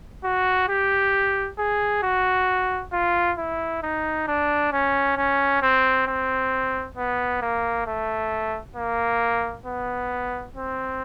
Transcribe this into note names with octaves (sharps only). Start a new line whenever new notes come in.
F#4
G4
G#4
F#4
F4
E4
D#4
D4
C#4
C#4
C4
C4
B3
A#3
A3
A#3
B3
C4